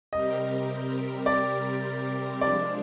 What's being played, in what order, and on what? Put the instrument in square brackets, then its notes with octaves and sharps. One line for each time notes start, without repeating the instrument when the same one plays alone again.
[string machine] C3 G3 C4 G4 A#4 [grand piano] D#5
[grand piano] D5
[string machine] F3 G#3 D4 [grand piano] D5